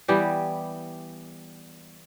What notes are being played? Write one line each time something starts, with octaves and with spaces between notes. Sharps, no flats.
E3 G3 B3 G4